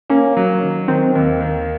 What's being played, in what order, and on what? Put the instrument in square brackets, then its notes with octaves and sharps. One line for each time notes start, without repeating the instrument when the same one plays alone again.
[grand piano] A#3 [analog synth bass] C#4
[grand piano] F#3
D#3
[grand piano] D#3 [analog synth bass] C4
[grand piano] D#2
D#3